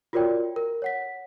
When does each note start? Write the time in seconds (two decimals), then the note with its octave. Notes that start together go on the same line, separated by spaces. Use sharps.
0.13 F4 F#4 A#4 C#5 D5 G5
0.56 A#4
0.82 C#5 F#5 B6